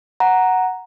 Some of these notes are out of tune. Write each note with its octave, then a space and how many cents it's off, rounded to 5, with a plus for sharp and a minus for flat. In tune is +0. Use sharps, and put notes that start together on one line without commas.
F#5 +0 A#5 +0